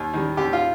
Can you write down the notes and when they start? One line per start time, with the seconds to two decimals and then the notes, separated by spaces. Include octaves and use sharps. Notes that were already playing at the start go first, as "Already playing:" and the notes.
Already playing: D#2
0.13 D#3 G3
0.37 D#2 G4
0.53 F4